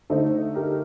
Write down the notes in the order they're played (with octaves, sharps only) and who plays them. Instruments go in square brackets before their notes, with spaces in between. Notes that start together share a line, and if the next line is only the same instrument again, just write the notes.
[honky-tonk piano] D3 A3 D#4 A4 C5
G4 A#4